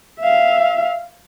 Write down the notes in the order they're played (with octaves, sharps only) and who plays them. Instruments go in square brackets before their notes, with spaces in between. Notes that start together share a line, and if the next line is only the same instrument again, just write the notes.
[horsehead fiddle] E5 F5